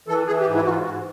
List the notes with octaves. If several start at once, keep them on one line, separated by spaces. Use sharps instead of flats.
E3 A4
E3 G#4
G4
G#2
E4
G#2 F4 F#4
G#2 F#4